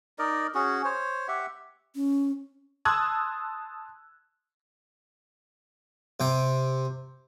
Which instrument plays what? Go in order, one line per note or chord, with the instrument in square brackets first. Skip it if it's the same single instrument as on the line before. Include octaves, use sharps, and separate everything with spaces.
[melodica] D#4 A#4 D5 D#5
C#4 F#4 G#4
C5 C#5
G4 E5 F#5
[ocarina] C#4
[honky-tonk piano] A5 C6 D#6 E6 F#6 G#6
[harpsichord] C3 G5